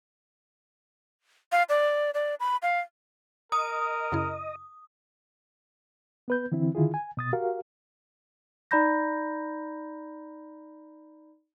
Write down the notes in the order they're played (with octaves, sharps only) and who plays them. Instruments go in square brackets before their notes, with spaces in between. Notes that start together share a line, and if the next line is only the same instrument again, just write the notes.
[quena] F5
D5
D5
B5
F5
[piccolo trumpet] A#4 [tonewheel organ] D#5 [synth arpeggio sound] A#5 [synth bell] D#6
[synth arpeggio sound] F#2 C#3 E4
[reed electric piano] B3 B4 G6
D3 E3 C4 E4
D3 D#3 E4 F4 G#4
G#5
B2 D#6 A6
F#4 G4 A#4 F5
[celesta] D#4 D5 A#5 B5 G6 A#6